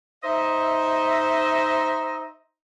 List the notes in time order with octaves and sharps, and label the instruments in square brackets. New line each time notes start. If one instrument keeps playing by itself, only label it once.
[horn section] D#4 C5 D#5 E5